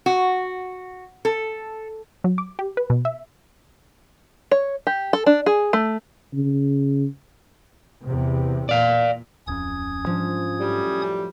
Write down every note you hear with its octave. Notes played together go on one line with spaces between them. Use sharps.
F#4
A4
F#3
D6
G4
B4
B2
E5
C#5
G4
A4
D4
G#4
A3
C#3
E2 C3
A#2 D5 F5
D1 F2 C#4 D#6 G#6
G#2 F3 D4
F#2 A2 G3